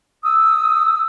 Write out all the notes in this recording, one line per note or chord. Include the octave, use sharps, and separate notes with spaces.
D#6 E6